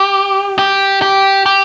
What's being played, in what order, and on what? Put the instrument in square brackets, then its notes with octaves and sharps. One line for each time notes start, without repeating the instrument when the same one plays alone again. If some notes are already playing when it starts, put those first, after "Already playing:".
Already playing: [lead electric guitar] G4
G4
G4
G4